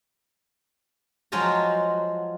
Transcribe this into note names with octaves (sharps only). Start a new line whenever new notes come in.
F3 F#3 G#3 F4 G#5 A#5